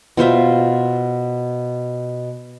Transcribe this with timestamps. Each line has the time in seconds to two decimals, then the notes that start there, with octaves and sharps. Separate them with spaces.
0.17 B2 F4 C5 E5